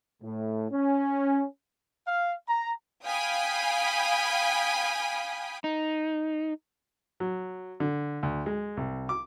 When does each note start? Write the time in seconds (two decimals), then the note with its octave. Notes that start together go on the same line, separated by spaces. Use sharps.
0.23 A2
0.72 C#4
2.07 F5
2.48 A#5
3.05 F5 G5 G#5 B5 D#6
5.64 D#4
7.20 F#3
7.80 D3
8.23 D2
8.46 G#3
8.77 C2
9.09 D6